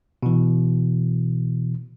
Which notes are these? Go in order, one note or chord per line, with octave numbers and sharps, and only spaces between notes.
B2 E3